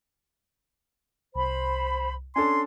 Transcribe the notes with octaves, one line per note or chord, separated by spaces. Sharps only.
C2 C5 B5
C#4 D4 A4 G#5 C6